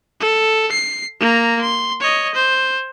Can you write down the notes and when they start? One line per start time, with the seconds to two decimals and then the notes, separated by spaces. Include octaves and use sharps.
0.20 A4
0.72 C7
1.21 A#3 A#5
1.62 C6
2.01 C#5 D#5
2.35 C5